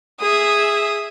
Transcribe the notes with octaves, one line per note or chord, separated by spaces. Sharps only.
G#4 E5 D#6